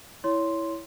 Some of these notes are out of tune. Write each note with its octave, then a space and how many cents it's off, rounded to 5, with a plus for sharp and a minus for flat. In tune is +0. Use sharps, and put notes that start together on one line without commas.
E4 +0 C#5 +15 C6 +0